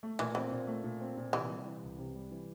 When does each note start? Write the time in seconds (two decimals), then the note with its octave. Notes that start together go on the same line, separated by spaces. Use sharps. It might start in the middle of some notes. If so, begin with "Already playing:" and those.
0.03 A3
0.19 A#2 E3
0.35 E3 C4
0.51 A#2
0.67 A3
0.84 A#2
1.01 C4
1.17 A#2
1.33 C3 E3
1.50 G3
1.66 E3
1.83 C2
1.98 C3
2.15 G3
2.31 E3